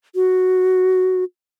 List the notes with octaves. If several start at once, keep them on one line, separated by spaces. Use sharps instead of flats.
F#4